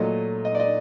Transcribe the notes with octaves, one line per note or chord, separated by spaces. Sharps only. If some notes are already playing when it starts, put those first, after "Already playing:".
Already playing: A#2 F#3 A3 D#5
D#5
D5
D#5